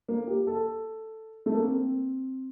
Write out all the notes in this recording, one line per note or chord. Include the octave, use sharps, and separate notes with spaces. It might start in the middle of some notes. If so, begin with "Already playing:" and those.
A#3
G4
A4
A3
A#3
C4